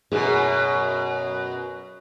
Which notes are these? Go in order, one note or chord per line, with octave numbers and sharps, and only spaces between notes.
F#2 B2 G#4